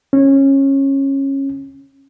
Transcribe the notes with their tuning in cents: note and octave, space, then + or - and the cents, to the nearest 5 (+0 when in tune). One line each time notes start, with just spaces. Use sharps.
C#4 -20